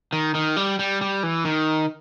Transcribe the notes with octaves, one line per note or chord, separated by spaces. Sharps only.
D#3
D#3
G3
G3
G3
E3
D#3